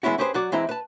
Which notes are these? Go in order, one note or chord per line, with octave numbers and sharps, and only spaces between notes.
E3 G#3 B3 C#4 E4 F#4
C#4 G4 G#4 B4 C5
F#3 F#4 D5
E3 G#3 C4 E4 D#5 A#5
B4 A5